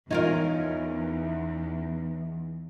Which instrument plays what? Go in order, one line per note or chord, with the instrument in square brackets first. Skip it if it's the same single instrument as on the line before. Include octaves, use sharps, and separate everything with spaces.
[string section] E2 [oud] C#4 F4 A#4 [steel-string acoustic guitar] D#4